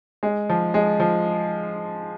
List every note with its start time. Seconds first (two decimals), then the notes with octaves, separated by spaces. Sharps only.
0.23 G#3
0.49 F3
0.74 G#3
1.00 F3